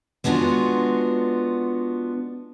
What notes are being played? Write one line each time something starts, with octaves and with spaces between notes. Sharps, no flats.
G#3 B3 D4 F4 F#4